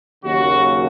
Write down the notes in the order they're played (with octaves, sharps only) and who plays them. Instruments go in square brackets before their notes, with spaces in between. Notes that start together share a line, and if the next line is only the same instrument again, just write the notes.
[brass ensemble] D#2 C#3 F#3 F#4